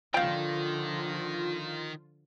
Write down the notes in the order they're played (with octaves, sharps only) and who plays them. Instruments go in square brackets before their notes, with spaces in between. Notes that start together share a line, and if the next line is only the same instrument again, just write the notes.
[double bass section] D3 F3 [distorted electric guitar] D#3 [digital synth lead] F4 [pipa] F5 G5